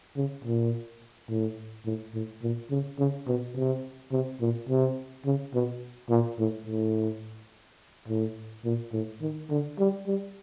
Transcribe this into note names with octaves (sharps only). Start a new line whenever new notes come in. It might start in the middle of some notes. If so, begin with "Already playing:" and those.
C#3
A#2
A2
A2
A2
A#2
C#3
C#3
B2
C3
C3
A#2
C3
C#3
B2
A#2
A2
A2
A2
A#2
A2
D#3
D3
G3
G3